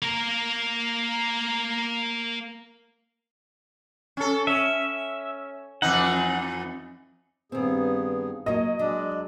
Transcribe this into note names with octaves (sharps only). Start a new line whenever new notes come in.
A#3 A#4
C#4 A4
C#4 E5
F2 E3 D#4 F#5
G2 D#3 B3 C4 G#4
F#3 A#3 D#5
F#3 G#3 D4 D5